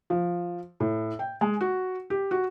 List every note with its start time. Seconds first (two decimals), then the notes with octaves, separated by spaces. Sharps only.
0.10 F3
0.80 A2
1.19 G5
1.41 G#3
1.61 F#4
2.10 G4
2.31 F#4